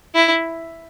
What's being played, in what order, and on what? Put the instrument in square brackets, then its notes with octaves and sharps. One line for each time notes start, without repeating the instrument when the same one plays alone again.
[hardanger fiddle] E4